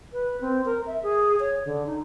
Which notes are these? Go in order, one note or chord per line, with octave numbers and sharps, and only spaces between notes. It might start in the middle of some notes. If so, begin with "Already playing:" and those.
B4
C4
A#4
E5
G#4
C#5
D3
D#4